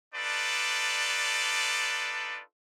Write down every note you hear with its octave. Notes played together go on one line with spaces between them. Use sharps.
D4 D#4 F4 A4 B4 D5